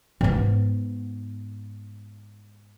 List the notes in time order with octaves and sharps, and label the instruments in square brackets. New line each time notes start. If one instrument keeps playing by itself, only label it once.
[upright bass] G#2 B3